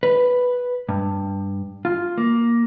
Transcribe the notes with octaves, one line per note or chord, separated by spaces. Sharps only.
B4
G2
F4
A#3